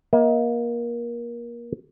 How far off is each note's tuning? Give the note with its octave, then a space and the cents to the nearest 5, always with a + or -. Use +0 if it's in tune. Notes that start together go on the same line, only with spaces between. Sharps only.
A#3 +25 D#5 +45